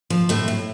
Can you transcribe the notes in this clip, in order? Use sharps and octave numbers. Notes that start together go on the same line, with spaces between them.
F3
A2 A3 C4
A2